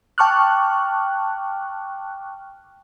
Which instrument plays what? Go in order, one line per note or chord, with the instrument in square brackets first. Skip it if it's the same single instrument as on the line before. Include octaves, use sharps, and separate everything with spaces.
[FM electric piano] G5 A5 C#6 D6 F6 F#6